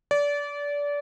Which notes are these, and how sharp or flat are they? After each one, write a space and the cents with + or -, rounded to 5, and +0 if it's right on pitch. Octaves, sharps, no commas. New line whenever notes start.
D5 -25